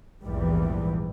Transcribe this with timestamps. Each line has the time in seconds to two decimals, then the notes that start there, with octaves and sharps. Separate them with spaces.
0.23 A#1 E2 G#2 E3 G3